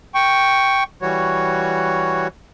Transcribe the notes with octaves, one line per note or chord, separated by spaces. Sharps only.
G5 C#6
E3 G3 F#4 C#5